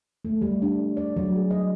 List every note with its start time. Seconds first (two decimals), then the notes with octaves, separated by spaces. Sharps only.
0.25 A3
0.41 G3
0.62 D4
0.97 D5
1.17 F#3
1.35 G#4
1.51 D#5